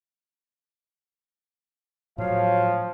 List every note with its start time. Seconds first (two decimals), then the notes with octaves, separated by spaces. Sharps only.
2.18 A2 F3 F#3 C#5 F5